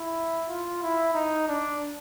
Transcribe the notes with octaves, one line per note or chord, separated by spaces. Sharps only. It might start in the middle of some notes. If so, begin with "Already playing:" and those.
Already playing: E4
F4
E4
D#4
D4